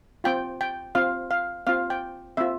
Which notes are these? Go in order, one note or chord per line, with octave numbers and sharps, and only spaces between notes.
C4 F4 G5
G5
C4 F4 F5
F5
C4 F4 F5
G5
C4 F4 E5